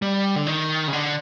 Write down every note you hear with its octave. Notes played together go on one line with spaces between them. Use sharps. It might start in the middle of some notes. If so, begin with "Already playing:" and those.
G3
D3
D#3
C#3
D3